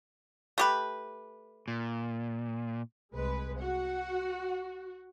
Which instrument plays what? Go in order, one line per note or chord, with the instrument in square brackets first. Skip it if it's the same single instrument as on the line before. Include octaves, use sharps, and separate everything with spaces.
[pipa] A3 G4 B4
[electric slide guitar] A#2
[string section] C2 G#3 B4
[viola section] F#4 [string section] F#5